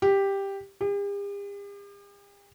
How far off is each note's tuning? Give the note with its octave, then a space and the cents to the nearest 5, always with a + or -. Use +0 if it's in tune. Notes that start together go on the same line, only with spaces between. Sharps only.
G4 +5
G4 +45